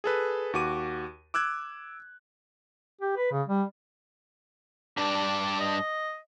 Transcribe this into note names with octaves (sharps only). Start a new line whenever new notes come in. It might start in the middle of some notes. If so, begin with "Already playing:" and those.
G#4 A4 B4
D#2 F#4 D6 D#7
D6 E6 F#6 G#6
G4
B4
C#3
G3
G2 D4 D5
D#5